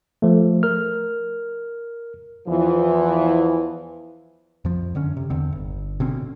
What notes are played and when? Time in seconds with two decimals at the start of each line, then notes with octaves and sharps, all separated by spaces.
0.22 F3 A3
0.63 A#4 F6
2.48 E2 E3 F3
4.65 F2 F3
4.95 F#2 D3 C#4
5.17 C3
5.30 E2 D3 C4
5.52 G1
6.00 B2 D3 C4 C#4